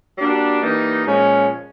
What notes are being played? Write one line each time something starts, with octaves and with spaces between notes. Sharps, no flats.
G3 A#3 D4 F#4
E3 G3 A#3 D#4
A#2 F3 G#3 C#4